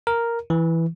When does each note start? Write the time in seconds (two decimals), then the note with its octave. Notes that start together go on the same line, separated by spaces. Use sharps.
0.07 A#4
0.50 E3